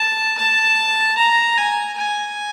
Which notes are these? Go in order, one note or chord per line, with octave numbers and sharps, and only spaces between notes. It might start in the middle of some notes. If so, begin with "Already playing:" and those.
Already playing: A5
A5
A#5
G#5
G#5